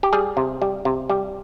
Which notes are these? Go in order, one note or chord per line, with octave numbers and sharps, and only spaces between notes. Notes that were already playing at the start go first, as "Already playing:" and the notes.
G4
G3 G#4
C3
G3
C3
G3